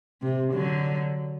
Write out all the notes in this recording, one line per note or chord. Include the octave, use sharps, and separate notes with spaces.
C3
D3 F#3